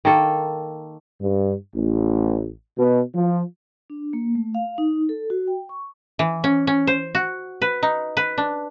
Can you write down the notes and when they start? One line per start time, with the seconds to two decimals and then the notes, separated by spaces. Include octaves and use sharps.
0.05 D#3 A#3 A4
1.21 G2
1.75 A1
2.78 B2
3.15 F3
3.90 D4
4.13 A#3
4.35 A3
4.55 F5
4.78 D#4
5.09 A4
5.30 F#4
5.47 G5
5.69 C#6
6.19 E3
6.44 C#4
6.67 C#4
6.87 C5
7.15 F#4
7.62 B4
7.83 D#4
8.17 B4
8.38 D4